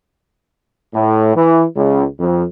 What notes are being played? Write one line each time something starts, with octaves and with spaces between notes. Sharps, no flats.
A2
E3
C#2
F2